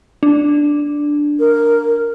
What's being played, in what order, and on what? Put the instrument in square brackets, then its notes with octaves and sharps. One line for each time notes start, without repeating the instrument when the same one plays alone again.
[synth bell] D4
[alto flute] A#4